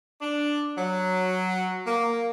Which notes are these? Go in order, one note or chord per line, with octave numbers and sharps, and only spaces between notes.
D4
F#3
A#3